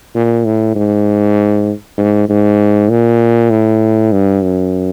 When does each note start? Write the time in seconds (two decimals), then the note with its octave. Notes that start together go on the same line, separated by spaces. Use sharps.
0.15 A#2
0.46 A2
0.75 G#2
1.98 G#2
2.29 G#2
2.89 A#2
3.50 A2
4.12 G2
4.42 F#2